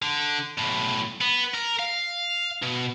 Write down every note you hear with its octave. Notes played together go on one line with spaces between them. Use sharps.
D3
B1 A2
B3
A#4
F5
B2